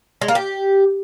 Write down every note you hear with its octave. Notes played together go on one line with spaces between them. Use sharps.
G#3
A#3
G4